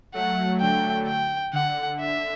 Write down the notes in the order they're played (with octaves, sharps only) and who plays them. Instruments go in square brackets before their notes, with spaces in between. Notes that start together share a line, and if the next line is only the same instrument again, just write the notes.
[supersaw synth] F#3 A3 [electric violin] F#5
[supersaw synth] D3 F#3 [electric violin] G5
[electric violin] G5
[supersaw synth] D3 [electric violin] F#5
[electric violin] E5